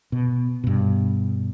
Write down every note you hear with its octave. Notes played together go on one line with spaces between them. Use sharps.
B2
G2 B2